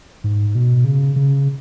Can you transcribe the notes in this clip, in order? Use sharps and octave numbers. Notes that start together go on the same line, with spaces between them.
G#2
B2
C#3
C#3